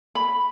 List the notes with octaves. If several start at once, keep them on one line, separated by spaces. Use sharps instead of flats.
B5